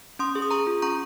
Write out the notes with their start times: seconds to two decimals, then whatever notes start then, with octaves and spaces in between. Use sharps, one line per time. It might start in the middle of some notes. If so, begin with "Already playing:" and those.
0.19 C#4 C6 D#6
0.35 G#4
0.42 D#6
0.51 G#4 A#5 C#6
0.67 F4
0.82 C#4 A#5 C#6